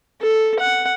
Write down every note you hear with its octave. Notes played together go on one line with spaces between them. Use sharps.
A4
F#5